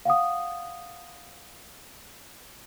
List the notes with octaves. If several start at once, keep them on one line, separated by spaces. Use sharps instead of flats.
F5 F#5 D#6